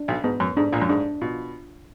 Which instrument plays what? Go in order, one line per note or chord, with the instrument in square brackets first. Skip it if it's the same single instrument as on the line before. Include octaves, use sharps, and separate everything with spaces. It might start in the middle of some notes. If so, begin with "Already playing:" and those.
Already playing: [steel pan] D4
[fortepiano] B1 B2
[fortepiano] G#2 [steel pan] B3
[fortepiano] F#2
[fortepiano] G#2 [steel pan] D4
[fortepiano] A#1 A#2
F#2
[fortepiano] G#2 [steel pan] D4
[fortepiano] B2 [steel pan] F4